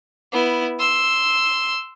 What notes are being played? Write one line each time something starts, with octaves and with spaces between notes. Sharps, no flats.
B3 E4
C6 E6